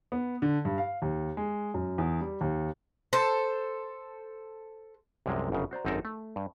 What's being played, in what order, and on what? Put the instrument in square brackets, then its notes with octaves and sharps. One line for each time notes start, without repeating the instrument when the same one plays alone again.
[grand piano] B3
D3
G2
F5
D#2
G#3
F#2
E2
G3
D#2
[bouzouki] A4 C5
[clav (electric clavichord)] C2 F#2 C3 F3 G#3
G1 F#2 C#3
F#4 C5 D5 A#5
G#1 F#2 C4 D#4 A4 A#4
A3
G2